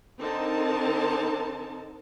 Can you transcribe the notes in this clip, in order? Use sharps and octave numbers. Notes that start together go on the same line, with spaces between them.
D3 C4 D#4 A#4 A5